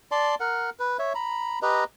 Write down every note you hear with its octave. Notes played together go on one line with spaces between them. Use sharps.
D5 A5 C6
A#4 F#5
B4
C#5 E5
A#5 B5
G4 B4 D#5 A#5